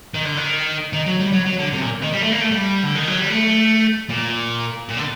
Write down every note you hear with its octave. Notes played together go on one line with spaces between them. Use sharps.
D#3
D3
D#3
D#3
F#3
G3
F#3
F#3
D3
C3
A#2
D#3
G3
A3
A#3
A3
G3
D3
D#3
F#3
G3
A3
A#2
A#2
D3